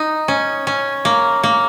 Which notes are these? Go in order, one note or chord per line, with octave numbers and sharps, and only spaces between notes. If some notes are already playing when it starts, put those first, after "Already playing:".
Already playing: D#4
C#4
C#4
A#3
A#3